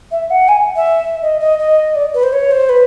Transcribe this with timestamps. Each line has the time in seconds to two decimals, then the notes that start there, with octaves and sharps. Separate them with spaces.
0.11 E5
0.30 F#5
0.48 G#5
0.76 E5
1.22 D#5
1.40 D#5
1.59 D#5
1.95 D5
2.14 B4
2.23 C5
2.32 C#5
2.51 C5
2.69 B4